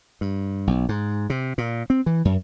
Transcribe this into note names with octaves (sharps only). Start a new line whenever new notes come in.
G2
B1
G#2
C3
A#2
C4
E3
F#2